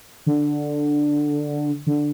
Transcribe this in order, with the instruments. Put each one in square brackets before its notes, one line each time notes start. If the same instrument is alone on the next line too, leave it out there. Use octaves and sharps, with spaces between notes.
[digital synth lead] D3
D3